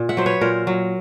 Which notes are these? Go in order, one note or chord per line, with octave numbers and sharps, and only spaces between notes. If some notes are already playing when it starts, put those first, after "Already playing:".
Already playing: A#2
E5 F#5
F#3 C5
B4 C#5
A#2 A#4 C5
F#3